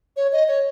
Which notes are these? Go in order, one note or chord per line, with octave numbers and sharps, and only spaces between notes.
C#5
D#5
C#5